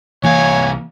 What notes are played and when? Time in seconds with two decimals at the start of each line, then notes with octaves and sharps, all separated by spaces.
0.24 C2 E3 A#3 C#5 F5 G#5